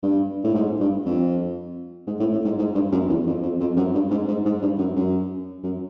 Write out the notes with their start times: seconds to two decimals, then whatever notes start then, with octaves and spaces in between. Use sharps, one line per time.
0.03 G2
0.44 A2
0.54 G#2
0.79 G2
1.05 F2
2.07 G#2
2.20 A2
2.32 A2
2.44 G#2
2.58 G#2
2.75 G2
2.92 F#2
3.09 E2
3.26 F2
3.42 F2
3.60 F2
3.76 F#2
3.94 G2
4.10 G#2
4.28 G#2
4.45 G#2
4.62 G2
4.79 F#2
4.96 F#2
5.63 F#2